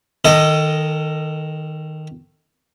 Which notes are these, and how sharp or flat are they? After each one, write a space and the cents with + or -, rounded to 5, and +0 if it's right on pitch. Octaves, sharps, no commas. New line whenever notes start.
D#3 +0 A4 +30 D#5 +0